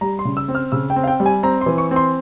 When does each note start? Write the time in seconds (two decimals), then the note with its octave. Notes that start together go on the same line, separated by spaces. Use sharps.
0.01 G3 A#5
0.19 C6
0.25 C#3
0.37 E6
0.48 C4
0.55 F6
0.72 C#3 E6
0.90 G5
0.96 C4
1.04 F5
1.07 G5
1.20 G3
1.26 G#5
1.43 C4 A#5
1.61 C6
1.66 E3
1.78 C#6
1.91 C4
1.96 C6